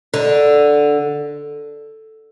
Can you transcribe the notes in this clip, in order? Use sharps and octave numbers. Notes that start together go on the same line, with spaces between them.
D3